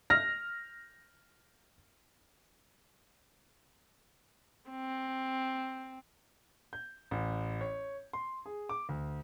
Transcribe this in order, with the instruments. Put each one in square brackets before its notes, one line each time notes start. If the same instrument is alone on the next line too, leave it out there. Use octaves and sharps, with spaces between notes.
[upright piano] F6 A#6
[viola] C4
[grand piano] G6
A1
C#5
C6
G#4
D6
D2